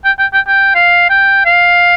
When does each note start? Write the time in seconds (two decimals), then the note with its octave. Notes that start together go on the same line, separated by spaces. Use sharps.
0.05 G5
0.19 G5
0.33 G5
0.48 G5
0.75 F5
1.10 G5
1.45 F5